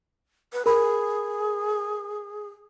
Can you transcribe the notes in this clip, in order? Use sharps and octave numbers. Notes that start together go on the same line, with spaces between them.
B4
G#4 A#4 B5